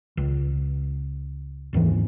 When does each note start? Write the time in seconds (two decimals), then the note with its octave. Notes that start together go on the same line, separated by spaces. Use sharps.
0.17 C#2
1.73 G#1 D#2 G#2 E3